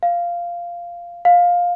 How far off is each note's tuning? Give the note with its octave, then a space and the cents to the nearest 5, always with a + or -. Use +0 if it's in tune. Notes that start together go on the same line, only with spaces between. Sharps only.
F5 -10
F5 +15